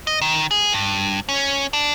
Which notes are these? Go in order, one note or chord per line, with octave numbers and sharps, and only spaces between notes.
D#5
D#3
G#4
G2
C#4
D4